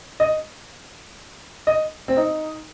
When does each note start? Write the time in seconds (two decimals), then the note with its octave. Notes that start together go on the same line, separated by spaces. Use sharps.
0.20 D#5
1.67 D#5
2.08 C4
2.17 D#4